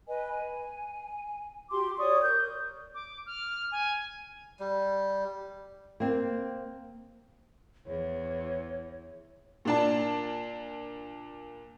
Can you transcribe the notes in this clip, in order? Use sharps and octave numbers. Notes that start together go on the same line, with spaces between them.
B4 D#5 G#5
G#5
F#4 G4 C6 D6
C#5 D5 C#6 D#6
A#4 G6
D6
F6
G#5
G3
A#3 C4
E2 C#5
A#2 D4 A5